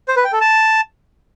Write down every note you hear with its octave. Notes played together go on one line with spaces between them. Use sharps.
C5
B4
G5
A4
A5